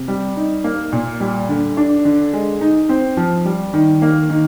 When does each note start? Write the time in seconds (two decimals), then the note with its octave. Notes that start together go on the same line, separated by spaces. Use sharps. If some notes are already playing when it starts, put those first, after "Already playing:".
Already playing: C3
0.08 G3
0.37 D#4
0.64 A#3
0.92 A#2
1.20 G3
1.49 D3
1.77 D4
2.05 D3
2.33 G#3
2.61 D#4
2.89 C4
3.17 F3
3.45 G3
3.73 D#3
4.02 A#3
4.30 D#3